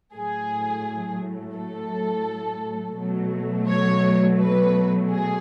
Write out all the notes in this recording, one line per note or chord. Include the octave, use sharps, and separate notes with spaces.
A2 F#3 A3 G#4
A4
B2 F#3 A3
C#5
B4
G#4